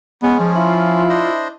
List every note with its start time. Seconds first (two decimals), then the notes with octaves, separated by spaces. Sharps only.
0.23 G#3 B3 C#4
0.40 F3 G#4 C5
0.55 E4 F4
1.09 D4 C5 D#5